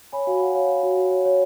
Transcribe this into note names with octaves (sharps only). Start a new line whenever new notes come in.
C#5 G#5 B5
F#4 F5 G#5
F#4 F#5
C#5 F5
C#5 F5
F#4
F#4
C#5
C#5